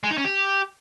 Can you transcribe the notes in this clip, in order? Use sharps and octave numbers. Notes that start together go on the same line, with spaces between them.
G#3
D#4
C#4
G4